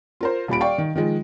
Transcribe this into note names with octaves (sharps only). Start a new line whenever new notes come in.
F4 A#4 C5
D#1 A#2 B5 D7
D5 F5 G5 C#6
D#3
D#3 F3 G#3